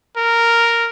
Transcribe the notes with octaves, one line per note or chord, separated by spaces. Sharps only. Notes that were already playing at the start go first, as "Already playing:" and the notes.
A#4